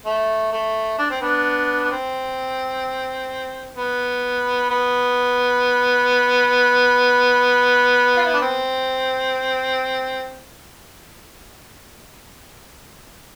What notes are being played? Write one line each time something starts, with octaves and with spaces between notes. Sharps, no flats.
A3
A3
D4
C4
B3 D4
D4
C4
B3
B3
F4
E4
D4
C4